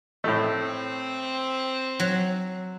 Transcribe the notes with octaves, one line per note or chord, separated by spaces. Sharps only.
A2 A3 C4
F#3